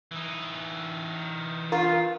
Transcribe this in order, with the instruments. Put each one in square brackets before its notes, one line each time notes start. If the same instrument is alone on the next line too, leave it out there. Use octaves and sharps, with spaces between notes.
[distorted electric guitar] E3 D#4
[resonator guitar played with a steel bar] F4 [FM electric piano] A#4